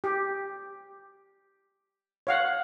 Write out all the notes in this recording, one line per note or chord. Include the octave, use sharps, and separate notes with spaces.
G4
C#5 F5 F#5